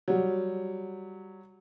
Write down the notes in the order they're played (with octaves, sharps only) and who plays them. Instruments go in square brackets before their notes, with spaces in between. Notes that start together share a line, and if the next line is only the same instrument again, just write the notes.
[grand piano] F#3 G3